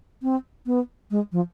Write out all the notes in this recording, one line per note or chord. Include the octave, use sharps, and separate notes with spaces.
C4
B3
G#3
F3